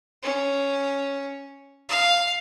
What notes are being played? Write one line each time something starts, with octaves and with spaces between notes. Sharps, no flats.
C#4
F5